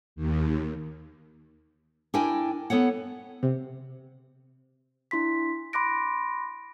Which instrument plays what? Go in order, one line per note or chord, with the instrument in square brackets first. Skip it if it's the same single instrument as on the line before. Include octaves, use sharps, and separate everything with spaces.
[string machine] D#2
[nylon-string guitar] D4 E4 A#4 G5 G#5
B3 A4 C#5 F#5
[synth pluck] C3
[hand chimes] D4 E4 C6 B6
B5 C6 D6 F#6 A#6 D7